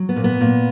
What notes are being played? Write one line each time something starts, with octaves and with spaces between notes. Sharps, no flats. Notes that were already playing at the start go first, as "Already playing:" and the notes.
Already playing: F#3
B3
A#2
B3
A#2